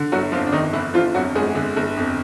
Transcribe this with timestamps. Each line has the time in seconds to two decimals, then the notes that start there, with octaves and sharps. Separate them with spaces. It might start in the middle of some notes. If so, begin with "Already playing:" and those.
Already playing: D3
0.12 G1 F#3 F#4
0.32 F2 F3 F4
0.47 D4
0.52 G1 D#3 D#4
0.73 D3 E3 E4
0.94 G1 F3 F4
1.14 F2 F#3 F#4
1.35 G1 G#3 G#4
1.55 D3
1.77 G1
1.97 F2